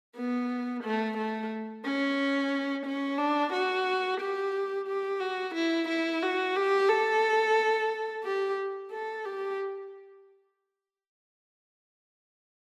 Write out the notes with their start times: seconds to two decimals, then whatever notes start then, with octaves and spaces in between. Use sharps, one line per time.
0.17 B3
0.83 A3
1.18 A3
1.85 C#4
2.86 C#4
3.18 D4
3.53 F#4
4.20 G4
4.88 G4
5.20 F#4
5.55 E4
5.89 E4
6.22 F#4
6.56 G4
6.89 A4
8.24 G4
8.92 A4
9.25 G4